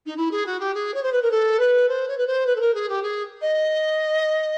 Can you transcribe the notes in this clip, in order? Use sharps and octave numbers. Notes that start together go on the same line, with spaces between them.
D#4
E4
G#4
F#4
G4
G#4
C#5
C5
B4
A#4
A4
B4
C5
C#5
B4
C5
B4
A4
A#4
G#4
G4
G#4
D#5